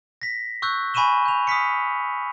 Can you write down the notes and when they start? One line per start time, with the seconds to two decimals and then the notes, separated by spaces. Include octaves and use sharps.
0.22 A#6 B6
0.62 C#6 E6 F#6 G6
0.94 G#5 B5 C#6 D#7 E7 G7
1.25 G6 F7
1.47 D#6 F6 B6 C#7